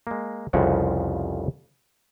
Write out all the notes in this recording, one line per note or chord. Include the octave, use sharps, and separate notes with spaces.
G#3 A#3
C2 F2 C#3 F3 F#5